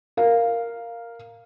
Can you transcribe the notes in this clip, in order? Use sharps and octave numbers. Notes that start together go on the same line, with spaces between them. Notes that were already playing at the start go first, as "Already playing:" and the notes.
A#4 F5